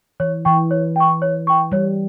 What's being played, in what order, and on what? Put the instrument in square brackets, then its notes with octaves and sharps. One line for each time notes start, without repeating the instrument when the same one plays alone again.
[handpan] E3 [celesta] C#5
[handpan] E3 [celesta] G5 C#6
[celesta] C#5
G5 C#6
C#5
G5 C#6
[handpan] G3 [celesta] C#5